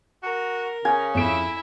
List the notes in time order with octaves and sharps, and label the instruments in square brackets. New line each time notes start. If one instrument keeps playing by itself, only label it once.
[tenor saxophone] F#4 [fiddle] A#4
[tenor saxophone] C#3 [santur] G#5
[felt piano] F2 D7 [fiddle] E4 E5